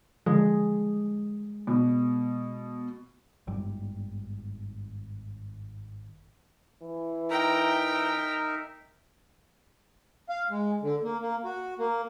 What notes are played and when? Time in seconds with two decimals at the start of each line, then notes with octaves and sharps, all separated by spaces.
0.26 D3 F3 G#3
1.67 B2
3.47 G#1 G2 G3
6.82 E3
7.30 D#4 A#4 E5 G5 A#5
10.29 F5
10.50 G#3
10.82 D3
11.03 A#3
11.21 A#3
11.45 F#4
11.79 A#3